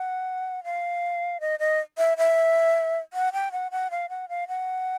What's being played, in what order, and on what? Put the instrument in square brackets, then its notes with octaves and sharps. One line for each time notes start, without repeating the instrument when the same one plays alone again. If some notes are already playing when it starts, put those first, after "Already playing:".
Already playing: [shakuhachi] F#5
F5
D#5
D#5
E5
E5
F#5
G5
F#5
F#5
F5
F#5
F5
F#5